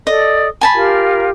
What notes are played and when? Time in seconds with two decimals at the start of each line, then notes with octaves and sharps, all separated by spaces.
0.07 A4 D5 D#5
0.61 G#5 A5 B5
0.74 F4 G4 A#4